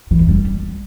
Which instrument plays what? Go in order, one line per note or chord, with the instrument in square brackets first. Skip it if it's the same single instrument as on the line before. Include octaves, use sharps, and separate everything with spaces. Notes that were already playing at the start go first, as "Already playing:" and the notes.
[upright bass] E3
F#2
G3